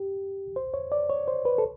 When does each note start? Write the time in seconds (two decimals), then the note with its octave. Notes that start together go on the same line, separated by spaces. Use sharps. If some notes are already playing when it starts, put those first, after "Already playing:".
Already playing: G4
0.56 C5
0.74 C#5
0.92 D5
1.10 C#5
1.28 C5
1.45 B4
1.58 A4